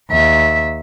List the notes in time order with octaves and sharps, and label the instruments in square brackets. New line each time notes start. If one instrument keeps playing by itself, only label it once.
[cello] D#2 E5